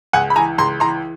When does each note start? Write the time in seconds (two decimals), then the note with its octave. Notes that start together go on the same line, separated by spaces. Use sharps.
0.13 C#2 F#5 G#5
0.30 B5
0.36 E3 G#5 A#5
0.58 C#2 A#5 C6
0.80 E3 A#5 C6